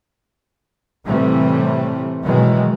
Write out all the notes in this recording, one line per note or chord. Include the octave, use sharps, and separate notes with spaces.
A2 C3 E3 G3 A3
B2 D#3 E3 F#3 G#3